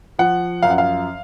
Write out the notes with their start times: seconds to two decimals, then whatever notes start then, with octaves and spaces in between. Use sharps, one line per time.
0.19 F3 F#5
0.62 F#2 F5
0.70 F#5
0.78 F5